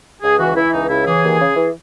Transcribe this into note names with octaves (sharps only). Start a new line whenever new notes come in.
C#2 G#4
E3 F#4
E3 E4
C#2 D#4
C#3 E4
E3 G#4
D#2
C#3
E3